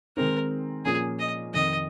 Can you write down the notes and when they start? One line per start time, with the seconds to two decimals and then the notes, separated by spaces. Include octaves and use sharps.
0.17 D#3 G#3 C4 D#4 A#4
0.85 A#2 F3 A#3 C#4 G#4
1.19 D#5
1.54 F2 C3 D#3 D#5